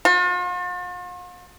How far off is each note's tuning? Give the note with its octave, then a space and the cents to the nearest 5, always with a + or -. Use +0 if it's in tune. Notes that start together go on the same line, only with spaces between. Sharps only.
F4 +45